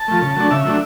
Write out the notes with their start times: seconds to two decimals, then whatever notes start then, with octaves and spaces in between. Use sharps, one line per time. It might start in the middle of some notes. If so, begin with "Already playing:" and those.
Already playing: A5
0.08 F3 A3
0.22 C#3
0.36 F#3 A3 D4
0.51 C#3 E5
0.65 F#3 A3 D4